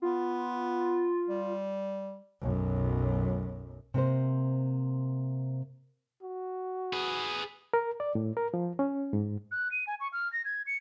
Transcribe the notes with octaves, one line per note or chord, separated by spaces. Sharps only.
B3 F4
G3
B1 F#2
C3 A#3 C5
F#4
G#4 B4
A#4
D5
A2
A#4
F3
C#4
G#2
F#6
D#7
G#5
C#6
F6
A#6
G#6
C#7